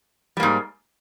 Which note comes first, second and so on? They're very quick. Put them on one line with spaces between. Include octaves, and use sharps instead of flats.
G3 A#3 G#2